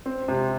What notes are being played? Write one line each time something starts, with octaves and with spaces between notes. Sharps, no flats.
C4
C3